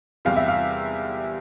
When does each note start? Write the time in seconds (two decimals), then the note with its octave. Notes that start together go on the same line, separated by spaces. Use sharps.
0.25 E2 C3 G3 F5
0.37 E5
0.48 F5